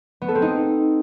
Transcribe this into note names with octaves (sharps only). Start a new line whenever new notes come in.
B3
A4
C4
D#4